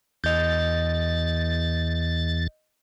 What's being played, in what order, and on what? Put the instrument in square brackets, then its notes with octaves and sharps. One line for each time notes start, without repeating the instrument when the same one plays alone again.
[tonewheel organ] E2 A6 [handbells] D#5 G6